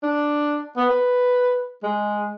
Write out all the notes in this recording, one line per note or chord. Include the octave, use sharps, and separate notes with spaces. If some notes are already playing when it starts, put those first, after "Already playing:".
D4
B3
B4
G#3